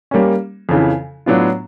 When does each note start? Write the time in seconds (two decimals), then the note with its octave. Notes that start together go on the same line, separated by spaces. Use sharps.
0.11 G3 A#3 C#4
0.69 F2 C#3 E3
1.26 A2 F#3 B3 D4 F4